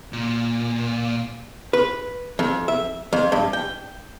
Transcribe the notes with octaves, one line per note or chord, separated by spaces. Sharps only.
A#2
B4
F2
E5
F2
G2
G5